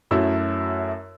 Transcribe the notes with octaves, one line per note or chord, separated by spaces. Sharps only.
F#2 F#3 A3 E4 E6